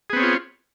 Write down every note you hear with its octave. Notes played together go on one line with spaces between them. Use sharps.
B3 C4 F4 G#4 C#5